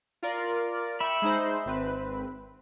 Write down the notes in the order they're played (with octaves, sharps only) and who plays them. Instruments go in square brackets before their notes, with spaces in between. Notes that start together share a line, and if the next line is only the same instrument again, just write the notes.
[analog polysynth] F4 A#4 D5
[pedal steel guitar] E5 B5 [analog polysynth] G5 C#6
[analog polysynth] G#3 D#4 C5
G#1 C4 B4